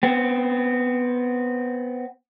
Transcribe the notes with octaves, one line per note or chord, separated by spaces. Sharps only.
B3 C4